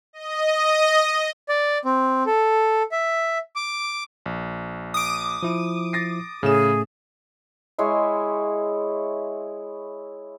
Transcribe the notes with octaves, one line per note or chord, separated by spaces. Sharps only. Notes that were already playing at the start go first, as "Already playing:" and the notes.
D#5
D5
C4
A4
E5
D6
A#1
D6 D#6
F3 E4
A6 A#6 C7
A2 C#3 A3 C#4 G#4 E7
G#3 E4 C#5 C6